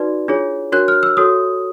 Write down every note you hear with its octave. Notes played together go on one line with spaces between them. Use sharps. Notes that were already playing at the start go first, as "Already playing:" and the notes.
Already playing: D#4 F#4 B4 D5
D4 F4 G#4 C#5
D4 F#4 A#4 C#5 F#6
F6
E6
F#4 A4 C#5 D#6